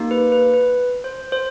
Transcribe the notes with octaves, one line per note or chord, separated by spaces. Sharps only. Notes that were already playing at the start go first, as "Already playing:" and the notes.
Already playing: A#3 D#4 G4
B4
B4
B4
C5
C5